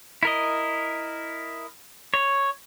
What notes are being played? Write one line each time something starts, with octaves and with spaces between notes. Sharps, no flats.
E4 A#4 D#5
C#5